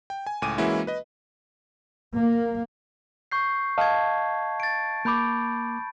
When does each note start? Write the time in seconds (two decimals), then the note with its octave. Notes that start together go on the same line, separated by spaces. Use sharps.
0.10 G5
0.27 G#5
0.42 C#2 A2 G#5 D6 D#7
0.58 E3 G#3 A#3 C#4 E4 F#4
0.87 B4 D#5
2.16 A#3
3.32 C#6 G6 C7
3.78 D#5 F5 A5 G#6
4.60 A6 D7
5.05 A#3 B5 D6 G6 D7